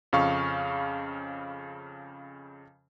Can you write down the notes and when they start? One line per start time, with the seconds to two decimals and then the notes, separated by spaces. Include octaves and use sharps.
0.13 F2 C#3 F5 C#6